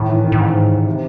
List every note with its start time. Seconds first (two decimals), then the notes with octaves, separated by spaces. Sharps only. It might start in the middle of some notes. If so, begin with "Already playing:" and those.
Already playing: A2 D#3
0.09 E3
0.24 D#3
0.32 A2
0.40 G#2 C#3
0.86 C3